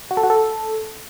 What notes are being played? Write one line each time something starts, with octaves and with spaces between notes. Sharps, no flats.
F#4
A4
F#4
A4